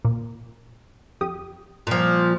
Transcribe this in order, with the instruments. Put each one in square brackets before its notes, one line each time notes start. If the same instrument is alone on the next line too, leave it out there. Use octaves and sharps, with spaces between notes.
[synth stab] A#2
F2 G4 D#6
[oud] A#2 F3